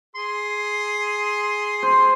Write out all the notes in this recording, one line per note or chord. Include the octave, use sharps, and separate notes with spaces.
G#4 C6
C5